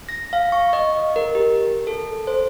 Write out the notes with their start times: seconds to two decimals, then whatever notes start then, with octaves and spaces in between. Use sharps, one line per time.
0.09 A#6
0.33 F5
0.52 C#6
0.73 D#5
1.16 A#4
1.35 G4
1.87 A4
2.27 C5